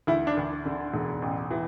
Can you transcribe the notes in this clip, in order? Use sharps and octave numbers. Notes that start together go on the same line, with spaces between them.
D2 E4
D4
D2
D3
E1
A1
E3